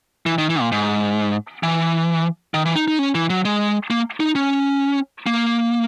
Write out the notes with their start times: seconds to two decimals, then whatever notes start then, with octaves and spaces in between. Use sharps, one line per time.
0.26 E3
0.38 D#3
0.50 E3
0.60 A#2
0.72 G#2
1.63 E3
2.54 D#3
2.65 E3
2.76 D#4
2.88 D#4
2.99 C#4
3.15 E3
3.30 F#3
3.45 G#3
3.90 A#3
4.20 D#4
4.35 C#4
5.26 A#3